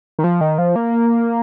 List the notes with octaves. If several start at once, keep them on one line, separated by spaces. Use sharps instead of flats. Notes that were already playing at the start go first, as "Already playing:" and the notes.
D#3
F3
D#3
F3
A#3